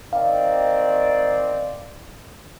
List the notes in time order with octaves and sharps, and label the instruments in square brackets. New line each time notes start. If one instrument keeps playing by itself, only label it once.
[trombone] D#3 [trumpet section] C4 D5 [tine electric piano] F5